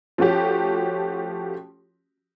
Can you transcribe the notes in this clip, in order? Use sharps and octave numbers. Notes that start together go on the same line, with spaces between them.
F3 A3 C#4 F#4 G4